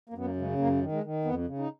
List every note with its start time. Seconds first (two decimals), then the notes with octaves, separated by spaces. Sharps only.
0.09 A#3
0.14 F#2 B3
0.25 A#3
0.36 C#3
0.42 G#3
0.58 F#2 A#3
0.81 D#3
0.92 G#3
1.04 D#3
1.25 F2 B3
1.47 C#3
1.58 D#4